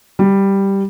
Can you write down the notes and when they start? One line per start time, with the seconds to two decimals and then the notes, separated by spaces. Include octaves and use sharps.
0.19 G3